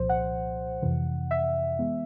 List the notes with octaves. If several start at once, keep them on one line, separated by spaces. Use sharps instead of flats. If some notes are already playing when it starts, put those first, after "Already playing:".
Already playing: C2 A#2 F3 C5
F#5
F2 C3 E3
E5
E3 G#3 B3